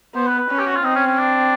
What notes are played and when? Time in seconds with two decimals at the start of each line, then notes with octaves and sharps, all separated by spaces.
0.15 B3 C5
0.27 B4
0.39 B4
0.50 C#4 B4
0.59 G4
0.66 F#4
0.76 F4
0.83 C4 D#4
0.95 C#4
1.07 C#4
1.18 D4